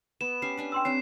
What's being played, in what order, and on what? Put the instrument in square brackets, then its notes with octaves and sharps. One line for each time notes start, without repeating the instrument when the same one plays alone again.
[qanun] B3 [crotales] E7
[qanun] C#4 G4 [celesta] C7
[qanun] C#4 D4 B4
[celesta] G5 C6 E6
[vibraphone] C4 [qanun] D4 G4 E5 [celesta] C#5 [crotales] C7